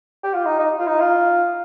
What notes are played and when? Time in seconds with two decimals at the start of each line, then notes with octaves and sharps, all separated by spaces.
0.23 G4
0.34 F4
0.46 D#4
0.59 D#4
0.79 F4
0.87 D#4
1.00 F4